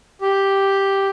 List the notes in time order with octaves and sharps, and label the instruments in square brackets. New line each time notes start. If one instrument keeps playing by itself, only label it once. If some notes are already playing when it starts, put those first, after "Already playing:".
[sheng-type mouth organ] G4